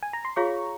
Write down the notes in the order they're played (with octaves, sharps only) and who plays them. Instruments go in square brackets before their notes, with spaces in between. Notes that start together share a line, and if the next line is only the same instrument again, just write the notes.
[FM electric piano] G#5
A#5
C6
[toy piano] F4 G#4 C#5 F5 [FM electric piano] A#5 C#6